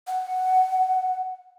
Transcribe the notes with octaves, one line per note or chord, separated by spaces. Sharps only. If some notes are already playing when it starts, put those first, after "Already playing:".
F#5